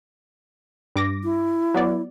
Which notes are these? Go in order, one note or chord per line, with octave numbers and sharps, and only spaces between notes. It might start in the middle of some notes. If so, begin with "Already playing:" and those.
G2 D6 A#6
E4
F#3 B3 D5